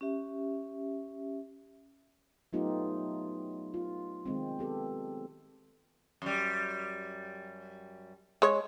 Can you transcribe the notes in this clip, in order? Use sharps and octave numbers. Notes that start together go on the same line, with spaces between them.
C#4 G4 E5
F#3 A3 B3 D#4 F4 G4
F4
D#3 G#3 C4
B3 G4 A4
F#2 G3
G#3 C#5